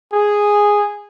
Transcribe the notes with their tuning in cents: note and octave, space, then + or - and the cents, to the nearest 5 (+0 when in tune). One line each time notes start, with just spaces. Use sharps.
G#4 -5